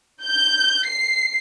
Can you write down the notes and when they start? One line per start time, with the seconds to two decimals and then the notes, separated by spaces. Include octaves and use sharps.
0.23 G6
0.86 C7